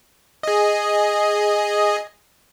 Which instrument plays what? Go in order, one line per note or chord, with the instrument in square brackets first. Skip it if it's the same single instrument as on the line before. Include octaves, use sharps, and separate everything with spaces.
[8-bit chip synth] G#4 D#5